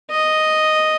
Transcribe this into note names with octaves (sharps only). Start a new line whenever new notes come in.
D#5